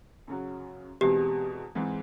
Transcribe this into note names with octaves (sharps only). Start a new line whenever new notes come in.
F#2 C#3 F#3
E2 B2 G#3 C4 G4
G#2 E3 G#3 C4